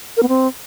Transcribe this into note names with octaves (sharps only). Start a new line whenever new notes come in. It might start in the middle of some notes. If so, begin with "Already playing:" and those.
A#4
B3
C4